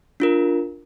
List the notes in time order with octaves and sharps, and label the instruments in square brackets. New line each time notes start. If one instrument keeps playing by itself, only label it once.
[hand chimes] D4 F4 A#4